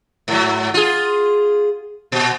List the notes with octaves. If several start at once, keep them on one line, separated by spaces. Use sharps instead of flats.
G#2 F#3
F4 G#4
A#2